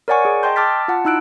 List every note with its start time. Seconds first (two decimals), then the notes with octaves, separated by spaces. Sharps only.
0.08 A#4 C#5 D5 F#5 G#5 C#6
0.25 G#4
0.43 D#5 G5 A5 C6 G6
0.56 A5 D6 E6 F6 A6 B6
0.88 F4 F#5 A5
1.05 D#4 E4 E6 F#6 D7